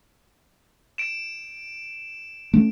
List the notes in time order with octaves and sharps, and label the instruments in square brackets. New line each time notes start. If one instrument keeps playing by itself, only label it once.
[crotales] D7 E7
[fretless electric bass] A3 C#4